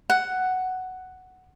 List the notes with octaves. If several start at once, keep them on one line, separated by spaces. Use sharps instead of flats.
F#5